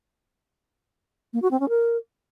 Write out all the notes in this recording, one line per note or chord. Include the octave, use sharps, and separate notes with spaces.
A#3
F#4
C4
C#4
A#4